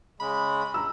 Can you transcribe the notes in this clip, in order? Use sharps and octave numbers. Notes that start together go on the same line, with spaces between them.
C#3 G#3 B5
A#5 E6